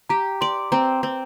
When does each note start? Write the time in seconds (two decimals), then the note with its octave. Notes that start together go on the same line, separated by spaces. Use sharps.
0.09 G4 A#5
0.41 D5 C6
0.72 C4 A#5
1.03 C4